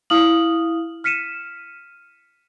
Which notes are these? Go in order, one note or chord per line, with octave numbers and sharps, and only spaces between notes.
E4 F5 D#6 F6 F#7
F6 B6 C#7 D#7 E7